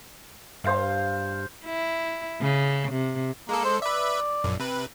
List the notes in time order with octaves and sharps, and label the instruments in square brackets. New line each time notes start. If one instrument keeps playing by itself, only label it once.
[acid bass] G2 [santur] C5 F5
[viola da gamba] E4
C#3
C3
[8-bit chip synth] G#3 A4 [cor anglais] A#3
[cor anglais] C5
[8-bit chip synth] B4 E5 [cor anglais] D5
[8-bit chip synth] A#1 F#2
C3 B4